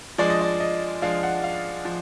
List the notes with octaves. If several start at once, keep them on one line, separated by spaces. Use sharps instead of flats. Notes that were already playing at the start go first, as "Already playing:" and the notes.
F3 G#3 D4 D5
D#5
D5
D#5
F3 G#3 D4 F5
F#5
F5
F3